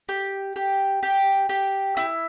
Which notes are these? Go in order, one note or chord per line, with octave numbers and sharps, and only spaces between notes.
G4
G4
G4
G4
E4